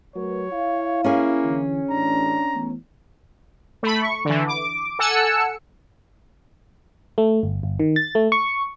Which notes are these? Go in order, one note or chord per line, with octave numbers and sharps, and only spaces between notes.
F#3 A3 A#4 B4 C#5
E4 F5
A#3 C#4 G#4 G#5
D3 E3
A1 D4 A#5
E3 A3 B3
A3 B5
C#6
D3 E3
D6
A4 F#5 G#5 E6 C#7
A3
G1
G1
D#3
A6
A3
C#6